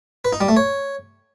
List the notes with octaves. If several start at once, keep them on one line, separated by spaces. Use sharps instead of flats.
B4
D#4
G3
A3
C#5